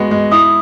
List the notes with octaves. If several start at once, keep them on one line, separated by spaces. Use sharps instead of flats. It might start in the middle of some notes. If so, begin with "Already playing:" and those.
Already playing: G#3 B3 F#4
G#3
E4 D#6